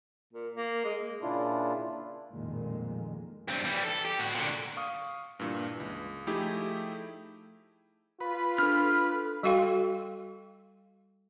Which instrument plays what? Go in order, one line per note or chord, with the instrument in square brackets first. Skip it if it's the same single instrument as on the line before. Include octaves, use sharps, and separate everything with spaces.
[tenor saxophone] A#2
A#3
G#3
[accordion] A#2 C#3 D4 E4 F4
[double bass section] A1 F2 A#2 D#3 G#3 A#3
[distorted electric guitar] G2 C4
E3 G3
A4
G4
A2 F#4
A#2 D3
[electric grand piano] F5 C#6 D#6
G2 A#2 E3
C#2
F3 A3 D#4 E4 G4 G#4
[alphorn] F4 [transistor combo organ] B4
[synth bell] D4 A4 [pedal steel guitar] F6
[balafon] G3 F#4 A4 F5 G5 C6